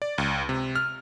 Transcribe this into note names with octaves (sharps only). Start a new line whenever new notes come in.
D5
C#2
C3
F6